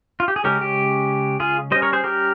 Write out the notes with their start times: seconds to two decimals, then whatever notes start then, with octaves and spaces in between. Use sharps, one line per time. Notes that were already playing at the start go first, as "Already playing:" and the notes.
0.20 F4
0.28 G4
0.36 G#4
0.44 C#3 G#3 C#4 G4 A#4
0.61 G4
1.40 F4 G#4
1.71 G3 C#4 C5 D#5
1.82 A#4 C#5
1.93 G#4 C5
2.04 G4 A#4